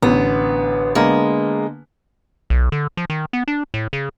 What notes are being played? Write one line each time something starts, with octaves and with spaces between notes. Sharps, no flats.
A1 D3 B3
D3 G#3 A#3 B3
B1
D3
F3
D#3
B3
D4
A2
C#3